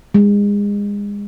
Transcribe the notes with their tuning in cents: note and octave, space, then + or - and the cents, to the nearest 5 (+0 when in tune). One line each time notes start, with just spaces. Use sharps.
G#3 -30